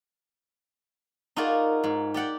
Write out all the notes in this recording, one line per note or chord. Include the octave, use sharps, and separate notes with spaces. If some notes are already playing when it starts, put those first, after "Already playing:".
D#4 F4 F#4 G#4 A#4 D5
G#2
G4 D5 F#5 G5